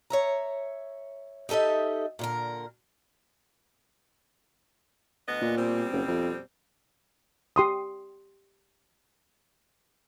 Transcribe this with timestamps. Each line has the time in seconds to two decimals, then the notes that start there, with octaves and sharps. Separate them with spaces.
0.10 C#5 E5 A#5
1.49 D#4 G4 A4 D#5 E5
2.19 A#2 D3 A#4
5.27 D2 B3 D#5
5.42 A#2
5.57 B2 G3 C4
5.93 F#1
6.08 F2
7.56 G4 C6 D#6